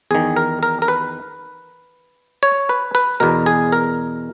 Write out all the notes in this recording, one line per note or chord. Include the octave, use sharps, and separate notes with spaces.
E2 D#3 G#4
A#4
A#4
A#4
B4
C#5
B4
B4
E2 B2 A#4
G#4
A#4